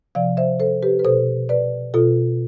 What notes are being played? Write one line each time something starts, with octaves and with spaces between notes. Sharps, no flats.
C3 F3 D5 F5
C5 E5
A4 C5
G4 B4
B4
B2 A4 C5
B4 D5
B2 F4 A4